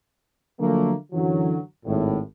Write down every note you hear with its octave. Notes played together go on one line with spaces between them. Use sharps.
D3 F3 F#3 A3 A#3
F#2 D3 E3 F#3
G#1 A2